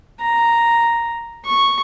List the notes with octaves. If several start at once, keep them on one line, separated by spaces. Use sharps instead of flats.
A#5
C#6